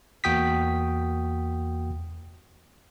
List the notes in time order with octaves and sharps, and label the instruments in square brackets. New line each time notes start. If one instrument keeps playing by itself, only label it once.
[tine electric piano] E2 A#3 F#4 G5 D#6 B6